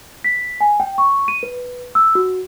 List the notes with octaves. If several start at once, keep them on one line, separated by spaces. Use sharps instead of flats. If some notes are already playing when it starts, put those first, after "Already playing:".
B6
G#5
G5
C#6
D#7
B4
E6
F#4